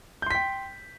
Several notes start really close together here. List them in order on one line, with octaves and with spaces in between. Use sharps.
G6 C6 B6 G5